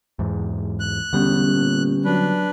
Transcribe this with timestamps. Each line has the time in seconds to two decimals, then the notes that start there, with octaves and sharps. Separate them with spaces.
0.19 E2 G#2
0.80 F#6
1.13 E1 D3 G3 B3 C#4 G4
1.54 A#2
2.05 F#3 D4 B4